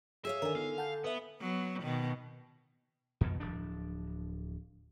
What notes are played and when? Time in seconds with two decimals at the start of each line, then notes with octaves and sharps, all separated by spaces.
0.25 G#4 C#5 E5 F5
0.42 D3 D#3 D4 A#4 G#5
0.55 B3 D#4 F4 F5
0.78 F#5 A5 G6
1.04 B3 B4 E5
1.41 F#3 B3
1.82 B2 D#3
3.21 F2 B2 D#3
3.40 D1 F3 D4